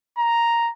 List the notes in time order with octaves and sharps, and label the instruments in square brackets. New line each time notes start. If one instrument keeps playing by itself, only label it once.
[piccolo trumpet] A#5